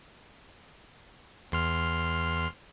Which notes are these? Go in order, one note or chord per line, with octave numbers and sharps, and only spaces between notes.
E2 C6 F6